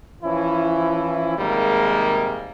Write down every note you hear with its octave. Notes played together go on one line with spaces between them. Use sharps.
E3 F3 C#4 E4
G#2 C3 D#3 G3 G#3 A#3